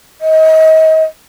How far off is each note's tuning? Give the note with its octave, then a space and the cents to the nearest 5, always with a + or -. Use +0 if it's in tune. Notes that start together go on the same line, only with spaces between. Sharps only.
D#5 +35